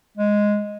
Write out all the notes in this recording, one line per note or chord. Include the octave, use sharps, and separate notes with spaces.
G#3